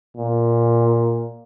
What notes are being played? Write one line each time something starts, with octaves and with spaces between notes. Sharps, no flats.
A#2